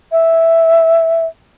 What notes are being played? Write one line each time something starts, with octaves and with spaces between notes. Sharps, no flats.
E5